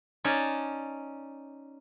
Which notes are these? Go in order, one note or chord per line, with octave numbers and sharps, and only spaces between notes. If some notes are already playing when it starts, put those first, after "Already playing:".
C#4 D#4 D5 A5